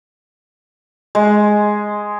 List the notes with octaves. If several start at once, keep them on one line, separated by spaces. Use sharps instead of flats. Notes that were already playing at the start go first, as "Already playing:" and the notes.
G#3